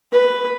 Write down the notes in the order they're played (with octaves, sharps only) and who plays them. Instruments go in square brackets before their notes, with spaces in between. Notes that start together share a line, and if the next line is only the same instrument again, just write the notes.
[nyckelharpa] B4